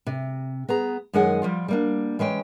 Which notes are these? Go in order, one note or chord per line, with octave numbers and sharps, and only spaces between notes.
C3
B3 G#4 A#5
F#2 D#3 G#3 G#4 F#5 G#5
F3 G3 F4
G3 A#3 D4
E3 G#3 C#4 G5